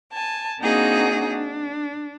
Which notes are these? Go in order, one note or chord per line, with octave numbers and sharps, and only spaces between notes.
G#5 A5
A#3 C4 D4 D#4 F#4 G#4
D4